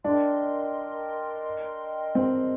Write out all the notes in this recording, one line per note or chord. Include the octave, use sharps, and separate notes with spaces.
D4 A#4 D#5 G5 C6
C4